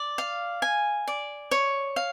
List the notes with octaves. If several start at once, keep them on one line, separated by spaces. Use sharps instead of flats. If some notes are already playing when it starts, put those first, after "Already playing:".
Already playing: D5
F5
G#5
D5
C#5
F5